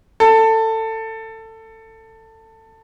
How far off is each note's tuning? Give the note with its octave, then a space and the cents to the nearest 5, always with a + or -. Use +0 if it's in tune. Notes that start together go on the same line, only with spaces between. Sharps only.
A4 +20